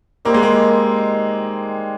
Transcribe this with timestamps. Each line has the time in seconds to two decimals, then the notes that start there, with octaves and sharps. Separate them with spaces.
0.25 D#3 G3 A#3 C4 D#4
0.34 G#3
0.43 A#3